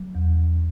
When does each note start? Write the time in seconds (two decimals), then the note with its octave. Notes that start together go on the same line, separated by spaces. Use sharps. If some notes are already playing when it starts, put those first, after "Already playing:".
Already playing: F#3
0.15 E2